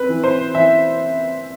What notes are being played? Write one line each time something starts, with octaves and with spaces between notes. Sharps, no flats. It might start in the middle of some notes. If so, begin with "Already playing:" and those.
Already playing: C4 B4
E3
C5
E3 E5